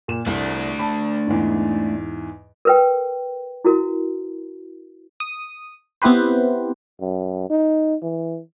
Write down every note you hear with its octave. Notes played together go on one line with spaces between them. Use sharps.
A#2 E7
C2 A3 D4
A5 B5
E2 G#2
A#4 B4 G5
E4 F#4 A#4
D#6
B3 C4 E4 G4 B4 C5
F#2
D#4
E3